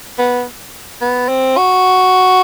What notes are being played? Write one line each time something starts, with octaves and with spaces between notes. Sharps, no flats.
B3
B3
C4
F#4